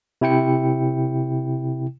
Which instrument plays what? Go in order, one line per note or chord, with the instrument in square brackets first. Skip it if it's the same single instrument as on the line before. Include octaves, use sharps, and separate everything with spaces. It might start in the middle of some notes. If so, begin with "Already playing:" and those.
[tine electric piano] C3 E4 G5 C#7